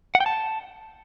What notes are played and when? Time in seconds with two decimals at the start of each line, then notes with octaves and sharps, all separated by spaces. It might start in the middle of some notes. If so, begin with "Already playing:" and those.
0.15 F#5
0.20 G5
0.26 A5